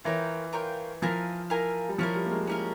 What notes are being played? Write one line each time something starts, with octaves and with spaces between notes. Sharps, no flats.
E3 F4 A#4 C#5 G5
F4 A#4 C#5 G5
F3 E4 A#4 F5 G#5
E4 A#4 F5 G#5
G3
F3 C#4 E4 A#4
G3
A#3
G#3
A#3 C#4 E4 A#4